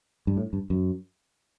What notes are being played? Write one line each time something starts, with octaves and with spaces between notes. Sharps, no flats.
G2
A2
G2
F#2